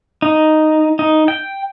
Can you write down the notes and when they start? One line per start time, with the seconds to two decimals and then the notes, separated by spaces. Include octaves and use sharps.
0.22 D#4
0.99 D#4
1.28 G5